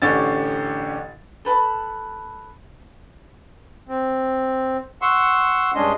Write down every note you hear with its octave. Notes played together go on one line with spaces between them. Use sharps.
A1 D3 C#4 G4 A6
A4 B4 A5 B5
C4
F#5 C6 C#6 E6
G2 G#3 C#4 D4 D#5 C6